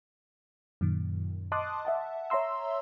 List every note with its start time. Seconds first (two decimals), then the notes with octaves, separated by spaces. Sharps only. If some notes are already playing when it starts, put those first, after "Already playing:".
0.81 F#2 A#2 D#3
1.52 D#5 A5 C6 D6 D#6 F#6
1.85 E5 F#5 A5
2.30 C#5 E5 A#5 C6 E6